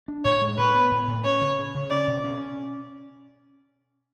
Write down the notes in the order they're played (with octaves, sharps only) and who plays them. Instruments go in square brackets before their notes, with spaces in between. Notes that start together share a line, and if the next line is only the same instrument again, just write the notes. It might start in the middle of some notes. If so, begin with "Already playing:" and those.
[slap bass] D4
[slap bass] A2 [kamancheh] C#5
[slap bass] G#3
[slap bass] A2 [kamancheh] B4
[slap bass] B3
A2
A2
[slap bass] C#4 [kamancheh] C#5
[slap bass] C#3
C#3
C#3
[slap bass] C#4 [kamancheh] D5
[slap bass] B2
C#4